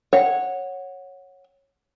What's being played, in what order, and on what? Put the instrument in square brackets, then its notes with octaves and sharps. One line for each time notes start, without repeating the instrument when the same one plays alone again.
[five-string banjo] C#5 F#5